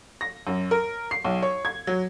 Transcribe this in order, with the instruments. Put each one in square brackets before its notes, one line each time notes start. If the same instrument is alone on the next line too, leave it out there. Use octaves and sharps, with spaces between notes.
[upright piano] A#6
F#2
A#4
C7
B1
C#5
G#6
F#3